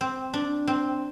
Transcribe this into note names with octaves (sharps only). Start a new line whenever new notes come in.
C4
D4
C4